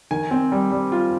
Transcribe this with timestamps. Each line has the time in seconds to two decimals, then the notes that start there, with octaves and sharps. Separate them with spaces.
0.11 D#3 G#5
0.31 C4
0.52 G3
0.71 G3
0.92 F4